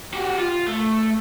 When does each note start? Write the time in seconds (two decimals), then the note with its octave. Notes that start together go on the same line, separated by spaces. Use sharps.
0.14 F#4 G4
0.38 F4
0.67 A3